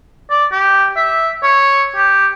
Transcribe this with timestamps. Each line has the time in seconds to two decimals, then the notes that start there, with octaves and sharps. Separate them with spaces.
0.30 D5
0.52 G4
0.96 E5
1.43 C#5
1.96 G4